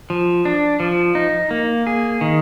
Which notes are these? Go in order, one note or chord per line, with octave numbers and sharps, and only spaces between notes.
F3
D4
F3
D#4
A#3
G#4
D#3